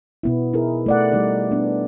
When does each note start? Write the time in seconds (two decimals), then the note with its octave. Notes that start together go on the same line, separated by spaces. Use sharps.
0.23 B2 B3 E4
0.53 D#4 E4 G#4 A#4
0.86 A3 D5 F#5
1.12 G3 A3 D#4 G4 D5
1.51 B3 D4